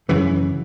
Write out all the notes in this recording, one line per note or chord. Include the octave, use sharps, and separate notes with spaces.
G#1 F#2 C#3 E3